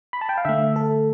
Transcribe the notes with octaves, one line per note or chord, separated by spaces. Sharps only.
B5
A5
G5
F5
D3 A3 E5
A4